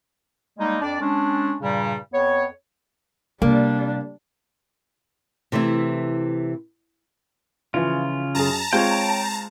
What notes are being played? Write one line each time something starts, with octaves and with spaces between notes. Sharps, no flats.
G3 G#3 A#3 D#4
F2 D4 D5
G#3 C#4 D4
G2 A#2 C#3 G3
F2 B3 C#5
C3 G3 A#3 D4
C3 E3 A3 E4
C#3 E3 F3 F4
F#2 G#4 A5 A#5
G#3 C4 F4 C#5 G5